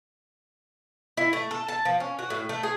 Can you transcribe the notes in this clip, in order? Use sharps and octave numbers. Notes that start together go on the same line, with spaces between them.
E4
A3
A4
A5
F3
C#4
F#4
A2
A3
G#4